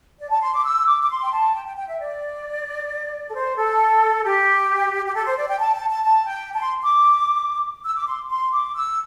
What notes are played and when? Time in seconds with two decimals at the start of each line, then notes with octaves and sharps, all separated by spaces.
0.19 D5
0.30 A5
0.41 C6
0.53 D6
0.65 E6
0.86 D6
1.02 D6
1.09 C6
1.21 G5
1.32 A5
1.54 G5
1.65 G5
1.76 G5
1.87 E5
2.00 D5
3.28 A4
3.34 C5
3.56 A4
4.24 G4
5.05 G4
5.14 A4
5.26 C5
5.37 D5
5.48 G5
5.59 A5
5.74 A5
5.89 A5
6.04 A5
6.27 G5
6.54 A5
6.61 C6
6.83 D6
7.84 E6
7.95 D6
8.06 C6
8.29 C6
8.51 D6
8.74 E6